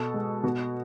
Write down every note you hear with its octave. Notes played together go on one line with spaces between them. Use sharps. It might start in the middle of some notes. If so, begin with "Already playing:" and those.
Already playing: B2 A4
G#3
B2 F#4